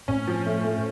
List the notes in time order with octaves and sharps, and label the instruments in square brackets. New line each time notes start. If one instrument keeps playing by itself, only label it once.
[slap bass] A2 [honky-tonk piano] C#4
[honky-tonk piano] F3
A3
A3